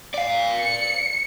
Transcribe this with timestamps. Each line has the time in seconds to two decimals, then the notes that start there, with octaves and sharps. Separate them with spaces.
0.14 D5 F5
0.59 C#7